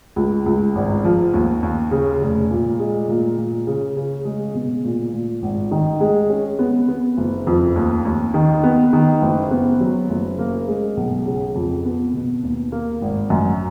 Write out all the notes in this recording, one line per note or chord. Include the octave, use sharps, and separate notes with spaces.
C#2
C#2
G#1
F3
D#2
D#2
C#3
F1
A#2
G#3
A#2
A#2
C#3
C#3
G#3
B2
A#2
A#2
G#1
D#3
G#3
C#4
B3
B3
F#1
F2
D#2
D#2
D#3
B3
D#3
F#1
B3
F#3
F#1
A#3
G#3
B1
C#3
F2
B3
B2
D#2
A#3
G#1
F#2